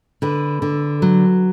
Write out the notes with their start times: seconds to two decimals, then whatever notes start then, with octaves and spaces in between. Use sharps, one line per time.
0.22 D3 B4
0.62 D3
1.02 F#3